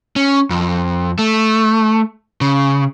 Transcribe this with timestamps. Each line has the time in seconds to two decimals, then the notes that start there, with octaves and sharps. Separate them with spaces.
0.16 C#4
0.50 F2
1.19 A3
2.41 C#3